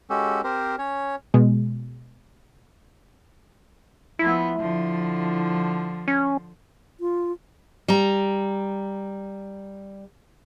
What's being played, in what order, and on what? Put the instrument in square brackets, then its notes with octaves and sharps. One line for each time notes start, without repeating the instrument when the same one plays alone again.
[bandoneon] G#3 C#4 F#4 G4 A4
C4 G4 A#4 C5
C#4 C#5
[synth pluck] B2 G#3
[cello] F3 B3 [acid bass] E4
[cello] D3 F3
[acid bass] C#4
[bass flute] F4
[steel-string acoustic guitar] G3 A#5